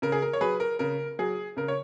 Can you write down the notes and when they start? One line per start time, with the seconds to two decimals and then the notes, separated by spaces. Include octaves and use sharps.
0.02 C#3 A#4
0.12 G#4
0.22 A#4
0.33 C#5
0.41 F#3 G#4 B4
0.60 A#4
0.79 C#3 A#4
1.19 F#3 G#4
1.57 C#3 A#4
1.68 C#5